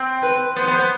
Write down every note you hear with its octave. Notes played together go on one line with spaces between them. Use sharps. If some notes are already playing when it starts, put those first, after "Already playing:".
Already playing: C4
B4
B3 C5
B3
B3